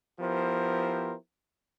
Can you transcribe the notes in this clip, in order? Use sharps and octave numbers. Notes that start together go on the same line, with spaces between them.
F3 B3 E4 G4 A#4 C5